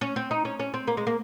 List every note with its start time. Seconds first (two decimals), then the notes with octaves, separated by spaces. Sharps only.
0.01 C#4
0.16 C4
0.31 D#4
0.45 C#4
0.59 C#4
0.74 C4
0.87 A#3
0.97 G#3
1.07 A#3